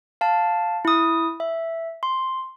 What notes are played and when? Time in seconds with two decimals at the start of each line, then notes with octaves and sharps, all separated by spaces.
0.21 F5 A5
0.85 E4 D#6
1.40 E5
2.03 C6